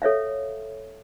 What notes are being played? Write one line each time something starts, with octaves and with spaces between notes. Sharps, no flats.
A4 C#5 E5 F5